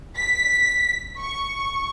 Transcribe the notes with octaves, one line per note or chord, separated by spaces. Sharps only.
B6
C#6